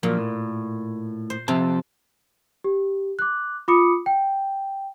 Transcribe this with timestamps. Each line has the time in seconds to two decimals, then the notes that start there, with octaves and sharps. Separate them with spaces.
0.03 A#2 F3 F#3 A#3
0.17 A2
1.30 C5
1.48 C3 F3 C4 A5
2.64 G4
3.19 D6 F#6
3.68 F4 B5 D6 D#6 C#7
4.06 G5